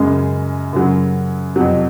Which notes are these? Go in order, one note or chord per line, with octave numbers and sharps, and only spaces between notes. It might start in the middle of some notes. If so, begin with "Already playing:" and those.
Already playing: F#2 C#3 G#3
F#2 C#3 F#3
F2 C3 F#3